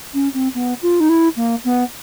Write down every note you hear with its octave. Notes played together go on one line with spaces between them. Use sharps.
C#4
C4
B3
F4
D#4
E4
A#3
B3